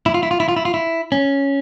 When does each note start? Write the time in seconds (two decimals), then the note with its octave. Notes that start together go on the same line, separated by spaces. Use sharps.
0.06 E4
0.14 F4
0.23 E4
0.31 F4
0.40 E4
0.49 F4
0.56 E4
0.65 F4
0.74 E4
1.12 C#4